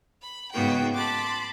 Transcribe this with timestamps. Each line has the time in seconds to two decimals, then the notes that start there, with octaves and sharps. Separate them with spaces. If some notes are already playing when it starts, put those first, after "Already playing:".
0.22 B5
0.52 G#2 C#3 A#3 B3 F#4 G5
0.94 A5 B5 C6 D6